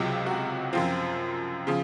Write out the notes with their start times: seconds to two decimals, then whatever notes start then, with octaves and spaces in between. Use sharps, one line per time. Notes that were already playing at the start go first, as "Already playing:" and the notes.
Already playing: C#2 C3 F#3 F4
0.26 F#4
0.73 F#2 F3 C4 F4
1.67 C#3 F3